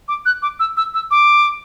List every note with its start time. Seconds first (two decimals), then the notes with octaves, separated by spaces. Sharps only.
0.08 D6
0.26 F#6
0.42 D6
0.60 E6
0.77 E6
0.94 E6
1.11 D6